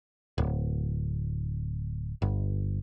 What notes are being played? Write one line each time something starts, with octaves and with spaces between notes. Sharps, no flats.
D1
G1